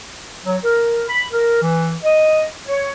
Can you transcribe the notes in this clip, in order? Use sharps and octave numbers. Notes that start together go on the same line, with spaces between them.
F#3
A#4
B5
A#4
E3
D#5
C#5